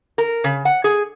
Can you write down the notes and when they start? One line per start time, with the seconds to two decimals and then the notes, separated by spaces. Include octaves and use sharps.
0.18 A#4
0.44 C#3
0.65 F#5
0.84 G#4